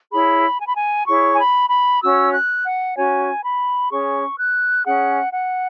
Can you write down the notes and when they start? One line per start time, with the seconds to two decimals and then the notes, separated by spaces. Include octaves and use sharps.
0.12 E4 G#4 C#5 B5
0.60 G#5
0.67 B5
0.75 G#5
1.06 E4 G#4 C#5 C#6
1.34 G#5
1.38 B5
1.70 B5
2.02 C#4 F#4 C#5 E6
2.33 F#6
2.64 F#5
2.96 C#4 F#4 C#5 G#5
3.43 B5
3.91 C#4 G#4 C#5 C#6
4.38 F#6
4.86 C#4 G#4 C#5 F#5
5.33 F#5